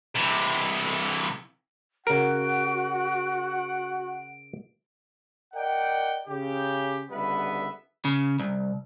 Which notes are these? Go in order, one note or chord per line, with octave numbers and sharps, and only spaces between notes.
C3 E3
C#3 F#4 A#4 F#5 D7
A#4 D5 D#5 F#5 G5
C#3 G4
C#2 D3 G3 B3 B4 E5
C#3
C2